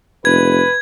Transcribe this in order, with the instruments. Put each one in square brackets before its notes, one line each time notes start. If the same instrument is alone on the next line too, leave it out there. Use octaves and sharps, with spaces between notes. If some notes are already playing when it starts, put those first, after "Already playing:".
[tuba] F1 [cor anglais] B4 [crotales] G#6